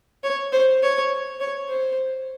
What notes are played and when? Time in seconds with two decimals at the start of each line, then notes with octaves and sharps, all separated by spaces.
0.24 C#5
0.53 C5
0.83 C#5
1.40 C#5
1.69 C5